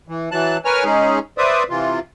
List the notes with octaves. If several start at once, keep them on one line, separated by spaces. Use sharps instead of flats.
E3
E3 F#3 A5 F#6
A#4 B4 C#5 G#5 F6
G#3 C#4 D#4 G#4
B4 C5 D5 E5 D#6
C3 E3 F4